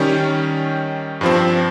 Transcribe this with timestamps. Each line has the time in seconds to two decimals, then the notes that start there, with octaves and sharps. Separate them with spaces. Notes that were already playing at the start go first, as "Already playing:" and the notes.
Already playing: D#3 G3 C#4
1.21 G2 F3 C4